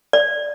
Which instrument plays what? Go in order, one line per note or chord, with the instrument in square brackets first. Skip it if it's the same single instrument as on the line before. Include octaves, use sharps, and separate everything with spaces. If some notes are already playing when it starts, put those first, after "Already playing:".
[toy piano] D5